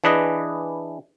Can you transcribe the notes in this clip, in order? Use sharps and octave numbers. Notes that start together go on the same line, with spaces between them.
E3 D4 G#4 B4 D#5